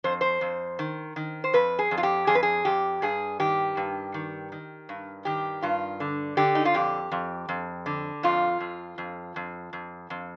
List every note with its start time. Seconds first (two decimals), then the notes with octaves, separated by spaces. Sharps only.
0.04 F2 C5
0.21 C5
0.41 F2
0.79 D#3
1.16 D#3
1.44 C5
1.53 F2 B4
1.79 G#4
1.91 F2
1.97 F4
2.03 G4
2.27 F2 G#4
2.35 B4
2.43 G#4
2.65 F2 G4
3.02 G2 G#4
3.40 D#3 G4
3.77 G2
4.14 D#3
4.52 D#3
4.89 G2
5.25 D#3 G4
5.62 G2 F4
6.00 D3
6.37 D3 G4
6.55 D#4
6.65 F4
6.74 F2 G4
7.12 F2
7.49 F2
7.86 D3
8.23 F2 F4
8.60 F2
8.98 F2
9.36 F2
9.73 F2
10.10 F2